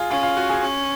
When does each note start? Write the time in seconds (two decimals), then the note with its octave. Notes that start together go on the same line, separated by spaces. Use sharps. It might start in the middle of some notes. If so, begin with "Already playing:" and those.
Already playing: F4 G#4
0.10 C#4 F4
0.23 F4
0.37 F#4
0.49 G#4
0.62 C#4